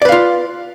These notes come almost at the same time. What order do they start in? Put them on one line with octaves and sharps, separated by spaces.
D5 B4 F5 F4